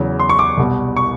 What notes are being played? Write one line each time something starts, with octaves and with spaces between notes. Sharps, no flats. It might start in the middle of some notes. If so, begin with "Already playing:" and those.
Already playing: E2 C#3 F#3
C6
C#6
D6
C2 B2 G3
C#6